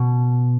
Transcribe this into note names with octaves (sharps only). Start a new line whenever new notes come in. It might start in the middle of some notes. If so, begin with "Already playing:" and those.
Already playing: B2